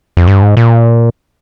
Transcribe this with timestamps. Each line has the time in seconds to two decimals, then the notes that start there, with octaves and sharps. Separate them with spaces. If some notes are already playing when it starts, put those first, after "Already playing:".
0.17 F2
0.28 G2
0.42 G#2
0.57 A#2